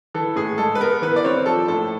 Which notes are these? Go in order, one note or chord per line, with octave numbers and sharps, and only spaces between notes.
E3 A4
A2 G#4
G#3 A4
B4
B3 A#4
E3 B4
D5
C4 C#5
F3 A4
A2 A4